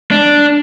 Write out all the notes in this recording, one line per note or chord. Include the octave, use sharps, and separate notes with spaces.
D4